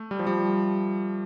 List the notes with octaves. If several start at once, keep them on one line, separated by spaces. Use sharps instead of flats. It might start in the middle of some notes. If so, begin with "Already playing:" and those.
Already playing: A3
G3
F3
G3